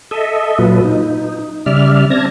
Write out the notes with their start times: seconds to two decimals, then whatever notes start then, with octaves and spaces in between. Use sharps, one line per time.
0.11 A4 D#5 E5
0.59 A#2 F#3 F4 B4
0.85 D#4
1.66 C#3 G3 D5 E5 F6
2.10 C4 A5 G#6 A#6